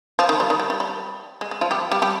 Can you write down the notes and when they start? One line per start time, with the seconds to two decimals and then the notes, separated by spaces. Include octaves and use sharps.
0.19 F3
0.29 D#3
0.40 G3
0.50 D#3
0.60 G3
0.70 G3
0.80 G3
1.41 G#3
1.51 G#3
1.61 F3 F4
1.71 G3 G4
1.92 G3 G4
2.02 G3 G4